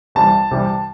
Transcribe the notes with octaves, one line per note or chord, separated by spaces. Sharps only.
C2 C3 E3 G3 A5
C2 C3 E3 G3